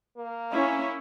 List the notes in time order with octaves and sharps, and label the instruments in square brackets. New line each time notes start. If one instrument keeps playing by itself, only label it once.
[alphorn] A#3
[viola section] C#4 [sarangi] E4